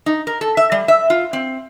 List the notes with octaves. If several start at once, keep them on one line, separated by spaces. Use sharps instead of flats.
D#4
A#4
A4
E5
G3
E5
F4
C4